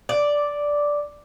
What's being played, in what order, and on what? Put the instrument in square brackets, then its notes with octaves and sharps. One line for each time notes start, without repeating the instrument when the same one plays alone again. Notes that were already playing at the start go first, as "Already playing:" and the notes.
[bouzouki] D5